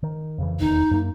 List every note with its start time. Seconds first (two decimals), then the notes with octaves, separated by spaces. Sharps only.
0.03 D#3
0.38 F2 C#3 E3
0.60 D#1 E2 D#3 D#4
0.91 F#2 A#3